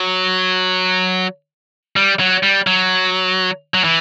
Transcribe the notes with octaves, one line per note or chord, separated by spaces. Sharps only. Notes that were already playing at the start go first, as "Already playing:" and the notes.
Already playing: F#3
G3
F#3
G3
F#3
F#3
E3